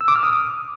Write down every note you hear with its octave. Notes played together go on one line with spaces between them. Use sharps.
E6
D6
F6
D#6